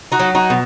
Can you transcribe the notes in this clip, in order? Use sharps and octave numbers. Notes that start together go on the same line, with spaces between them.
D#4 F#4
F#3
D#4 F#4
B2